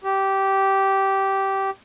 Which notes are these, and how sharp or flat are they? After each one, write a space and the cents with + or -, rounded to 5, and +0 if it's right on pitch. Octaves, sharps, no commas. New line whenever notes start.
G4 -15